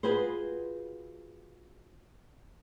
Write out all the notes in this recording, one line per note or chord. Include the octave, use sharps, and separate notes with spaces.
F4 F#4 G#4 B4 C5